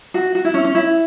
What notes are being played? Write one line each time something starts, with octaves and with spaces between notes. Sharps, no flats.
F#4
F#4
E4
C#4
C#4
E4